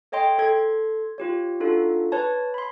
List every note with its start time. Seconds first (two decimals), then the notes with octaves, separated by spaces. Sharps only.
0.12 A4 C#5 D#5 G5 C6
0.38 A4 C6 G#6
1.18 F4 G4 C#5
1.60 D4 D#4 F4 F#4 A4
2.12 B4 C#5 A5
2.54 B5 C6